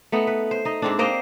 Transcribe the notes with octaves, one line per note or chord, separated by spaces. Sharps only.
A3 B3 D#4
B4
C5
D#4 D#5
G#2 C4 D4
A#3 C5 D#5 G5